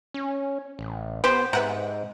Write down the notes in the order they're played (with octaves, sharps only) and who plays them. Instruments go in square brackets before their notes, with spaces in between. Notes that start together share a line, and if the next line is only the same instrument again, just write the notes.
[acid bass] C#4
A1
[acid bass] B3 [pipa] G4 C5 [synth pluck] B4
[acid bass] G#2 [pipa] C3 [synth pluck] B4 F#5 A#5